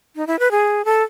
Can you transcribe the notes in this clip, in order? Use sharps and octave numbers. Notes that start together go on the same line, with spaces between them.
D#4
E4
B4
G#4
A4